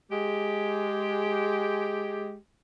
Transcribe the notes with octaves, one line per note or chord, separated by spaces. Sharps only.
G#3 G4